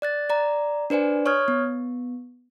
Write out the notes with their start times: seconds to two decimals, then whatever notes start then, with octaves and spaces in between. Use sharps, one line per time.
0.02 D5 F#6 A6
0.30 D5 A#5
0.90 D4 B4 C5 D5 G#5
1.26 C#5 C#6 D#6 F6 G#6
1.48 B3